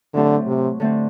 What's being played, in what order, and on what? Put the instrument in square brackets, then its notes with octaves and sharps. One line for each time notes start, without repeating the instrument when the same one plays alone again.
[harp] A2 F#3 A3 C4 G4 [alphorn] D3
[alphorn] C3
[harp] D3 A3 C4